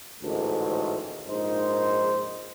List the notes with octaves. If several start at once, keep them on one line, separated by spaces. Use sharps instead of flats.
A1 D2 G#2 D#3 A4
A#1 G#2 D#4 C5